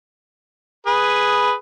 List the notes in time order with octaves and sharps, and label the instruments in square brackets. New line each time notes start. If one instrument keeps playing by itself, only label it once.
[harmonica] G#4 B4